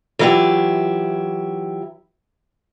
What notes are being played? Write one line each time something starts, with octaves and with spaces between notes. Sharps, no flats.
E3 F#3 E4 F4 G4